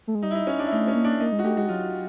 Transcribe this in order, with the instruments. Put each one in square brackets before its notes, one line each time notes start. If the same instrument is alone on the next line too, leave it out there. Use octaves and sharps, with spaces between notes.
[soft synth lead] A3
G#3
[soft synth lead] G3 [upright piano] D#4
[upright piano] E4
D#4
C#4
D4
E4
[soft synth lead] A3 [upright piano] D#4
[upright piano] C#4
[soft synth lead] A#3
[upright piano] D4
[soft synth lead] A#3 [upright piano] D#4
[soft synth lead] G#3
[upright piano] F#4
[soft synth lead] A3 [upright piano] G4
[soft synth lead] G#3 [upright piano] F#4
[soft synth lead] F#3 [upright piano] F4